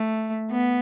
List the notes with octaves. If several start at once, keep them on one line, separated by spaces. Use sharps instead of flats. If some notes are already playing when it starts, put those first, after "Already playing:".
Already playing: A3
B3